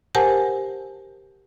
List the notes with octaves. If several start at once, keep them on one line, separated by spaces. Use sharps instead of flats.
G4 A#4 C5 F#5 G#5 A5